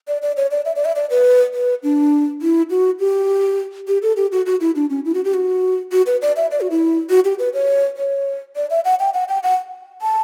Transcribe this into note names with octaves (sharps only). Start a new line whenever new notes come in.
D5
D5
C#5
D5
E5
D5
E5
D5
B4
B4
D4
E4
F#4
G4
G4
A4
G4
F#4
F#4
E4
D4
C#4
E4
F#4
G4
F#4
F#4
B4
D5
E5
D5
F#4
E4
F#4
G4
B4
C#5
C#5
D5
E5
F#5
G5
F#5
G5
F#5
A5